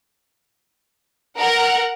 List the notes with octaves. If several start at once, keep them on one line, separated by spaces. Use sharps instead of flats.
A#4 F#5